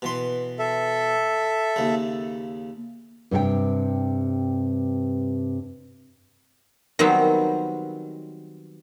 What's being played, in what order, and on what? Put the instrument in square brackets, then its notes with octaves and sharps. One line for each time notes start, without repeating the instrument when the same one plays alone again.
[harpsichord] B2 E3 C6
[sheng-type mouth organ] A4 E5
[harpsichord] D#2 C#3
[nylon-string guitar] G2 C3 A4 G5
[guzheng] D#3 F#3 G3 B3 C4